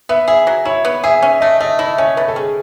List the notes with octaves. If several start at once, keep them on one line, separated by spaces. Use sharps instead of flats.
B3 E5
G#4 E5
F#3
E4 C#5
B3
G#4 E5
C#4 E5
A3 D#5
A3 D#5
E4 D#5
C#4 C#5
A3 B4
A4
C#4 G#4